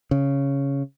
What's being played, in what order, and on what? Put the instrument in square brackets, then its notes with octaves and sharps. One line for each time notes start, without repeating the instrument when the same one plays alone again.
[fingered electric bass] C#3